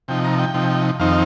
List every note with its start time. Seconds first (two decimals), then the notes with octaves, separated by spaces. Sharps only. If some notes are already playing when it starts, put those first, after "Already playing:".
0.08 C3 F3 D#4 G5
0.24 A#5
0.39 G5
0.54 C3 F3 D#4
1.00 F2 D#3 C4 D#4 F5